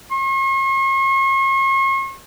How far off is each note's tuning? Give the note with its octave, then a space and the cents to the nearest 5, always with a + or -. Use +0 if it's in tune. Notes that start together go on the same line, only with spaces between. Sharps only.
C#6 -45